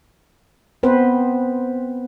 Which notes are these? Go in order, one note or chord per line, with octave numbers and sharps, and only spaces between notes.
B3 C4 B4 C5